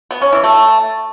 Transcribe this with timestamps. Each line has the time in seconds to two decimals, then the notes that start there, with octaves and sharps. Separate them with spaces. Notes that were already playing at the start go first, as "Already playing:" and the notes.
0.11 B3
0.22 C#4
0.33 E3
0.44 A3